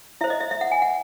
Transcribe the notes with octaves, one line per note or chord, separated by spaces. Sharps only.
E4 C5 E5
D#5
E5
E5
F#5
G#5
F#5